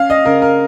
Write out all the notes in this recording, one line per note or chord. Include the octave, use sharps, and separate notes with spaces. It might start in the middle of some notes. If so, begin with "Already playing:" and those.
Already playing: C#4 F5
D#5
C#3 A#4
A#4